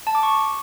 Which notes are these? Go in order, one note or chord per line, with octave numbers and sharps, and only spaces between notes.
A5
D6
C#6